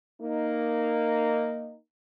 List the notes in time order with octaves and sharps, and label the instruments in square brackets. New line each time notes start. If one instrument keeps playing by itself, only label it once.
[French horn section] A#3 D#4